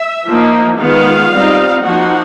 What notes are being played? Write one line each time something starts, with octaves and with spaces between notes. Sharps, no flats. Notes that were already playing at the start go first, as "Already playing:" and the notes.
Already playing: E5
F3 A#3 D#4
D#3 G#3 B3 F4 F5
G3 C4 D#4
F3 A#3 D#4 F#4 F#5